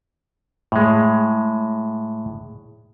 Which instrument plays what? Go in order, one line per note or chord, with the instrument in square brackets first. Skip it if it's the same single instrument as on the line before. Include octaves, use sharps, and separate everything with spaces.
[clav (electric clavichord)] A2 G#3